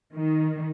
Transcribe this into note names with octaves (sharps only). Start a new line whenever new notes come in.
D#3